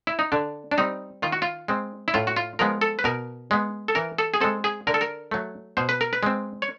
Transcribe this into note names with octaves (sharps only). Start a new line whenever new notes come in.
E4
D#4
D3 D4
D4
G3 C4 D#4
D#3 F4
F#4
F4
G#3 C4
E4
A2 F4
F#4
F4
F3 G#3 B3 A#4
A4
B4
B2 A#4
G#3 B3
A4
E3 A#4
A4
G#4
G#3 C4 A4
G#4
D3 A#4
A4
A#4
F#3 A3
B2 C5
B4
A#4
B4
G#3 C4
C#5